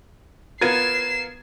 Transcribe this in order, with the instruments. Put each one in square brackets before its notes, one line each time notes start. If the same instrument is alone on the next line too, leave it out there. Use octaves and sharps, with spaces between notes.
[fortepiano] B3 F4 A#4 [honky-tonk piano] G#6 A6 D#7 [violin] C7 E7